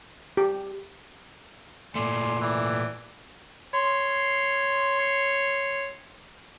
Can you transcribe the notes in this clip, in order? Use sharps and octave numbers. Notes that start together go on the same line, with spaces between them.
G4
A#2 A3 D5 G#5 C6
E3 D5
C#5 C6